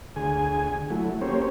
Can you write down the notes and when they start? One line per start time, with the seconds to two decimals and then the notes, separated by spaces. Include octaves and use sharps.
0.16 D2 G#4 G#5
0.90 F#3 A3 E4
1.21 A#3 C#4 G4 C5 C#5